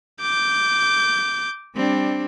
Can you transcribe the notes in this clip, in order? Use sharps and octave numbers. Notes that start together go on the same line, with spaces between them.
D6 G6
G3 C4 D4